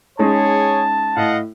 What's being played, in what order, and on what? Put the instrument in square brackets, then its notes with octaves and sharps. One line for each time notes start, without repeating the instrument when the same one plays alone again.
[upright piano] G#3 C#4 D#4 [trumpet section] G#4 C#5 [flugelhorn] A5
[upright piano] A2 [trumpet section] D#5 F5 F#5